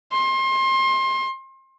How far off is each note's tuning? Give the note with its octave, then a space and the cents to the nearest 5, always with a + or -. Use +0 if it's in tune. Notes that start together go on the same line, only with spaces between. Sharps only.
C6 +30